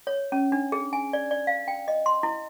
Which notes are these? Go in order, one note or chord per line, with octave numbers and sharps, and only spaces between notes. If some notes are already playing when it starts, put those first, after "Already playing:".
C#5
C#4
D4
G#4
G#5
D5
D5
F5
G5
D#5
C6
E4